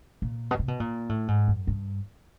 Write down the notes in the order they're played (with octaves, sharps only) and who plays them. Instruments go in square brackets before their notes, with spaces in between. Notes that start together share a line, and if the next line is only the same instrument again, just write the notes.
[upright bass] A#2
B2
C3
B2
A#2
A2
G#2
F#2
G2